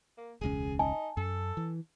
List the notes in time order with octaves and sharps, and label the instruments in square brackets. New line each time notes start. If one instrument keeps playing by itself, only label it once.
[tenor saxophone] A#3
[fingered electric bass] E1 C#2 C#4 [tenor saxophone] G#4
[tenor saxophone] D#4 [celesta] G#5 A5
[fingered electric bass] F#2 [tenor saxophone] A4
[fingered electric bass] E3